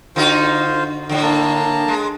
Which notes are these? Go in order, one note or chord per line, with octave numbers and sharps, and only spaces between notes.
D3 D#4 F4 F#4 C5
A2 D3
A#3 A5 A#5
G#3